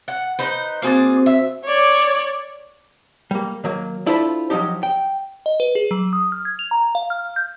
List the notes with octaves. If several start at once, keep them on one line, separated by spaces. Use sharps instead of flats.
F#5
D#4 B4 C5
A#3 C4 F#4 G#4 C5 D5
E5
C#5 D5
G3 A#3
D#3 F#3 A#3
D4 E4 F4 A4 C5 B5
F3 F#3 D4 D#4 G4
G5
D#5
B4
G#4
F#3
D#6
F6
G#6
F7
A#5
F5
F6
G6